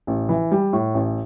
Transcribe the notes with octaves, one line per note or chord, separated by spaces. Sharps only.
A1
E3
G3
A2
A1